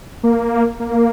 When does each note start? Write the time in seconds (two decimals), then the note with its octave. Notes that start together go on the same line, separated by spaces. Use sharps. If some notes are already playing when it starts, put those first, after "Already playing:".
0.23 A#3
0.80 A#3